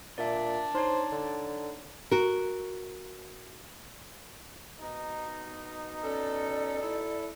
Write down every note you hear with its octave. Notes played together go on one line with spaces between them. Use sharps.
A#2 D4 D5 E5
D#4 C5 C#5
D3
F#4 A#4
B2 D#4
C#4 A4 D5
E4 A4